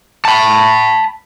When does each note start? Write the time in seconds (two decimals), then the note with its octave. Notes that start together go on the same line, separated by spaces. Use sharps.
0.25 A5 B5